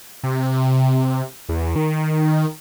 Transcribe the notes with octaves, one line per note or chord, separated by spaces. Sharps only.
C3
E2
D#3